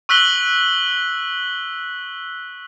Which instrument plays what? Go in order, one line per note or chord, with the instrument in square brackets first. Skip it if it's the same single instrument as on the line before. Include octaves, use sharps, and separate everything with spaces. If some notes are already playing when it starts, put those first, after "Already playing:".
[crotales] C#6 E6 F#6 B6 F#7 G7